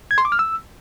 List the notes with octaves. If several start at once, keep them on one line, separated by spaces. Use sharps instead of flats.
G#6
C6
D6
F6
E6